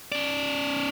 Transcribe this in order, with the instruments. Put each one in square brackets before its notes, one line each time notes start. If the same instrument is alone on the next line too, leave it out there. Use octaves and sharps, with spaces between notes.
[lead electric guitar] C#4 D5